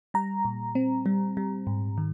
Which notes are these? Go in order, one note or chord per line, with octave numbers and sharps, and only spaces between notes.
G3 A#5
A#2
C4
G3
G3
G#2
D#3